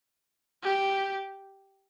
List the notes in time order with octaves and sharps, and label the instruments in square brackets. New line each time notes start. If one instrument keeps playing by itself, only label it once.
[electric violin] G4